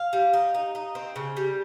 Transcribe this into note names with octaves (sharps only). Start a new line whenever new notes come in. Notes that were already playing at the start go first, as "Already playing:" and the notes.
Already playing: F5
G3
D#4
D#4
D#4
C4
C#3
G3